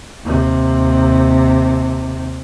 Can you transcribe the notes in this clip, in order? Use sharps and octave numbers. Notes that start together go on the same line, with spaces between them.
D#2 C3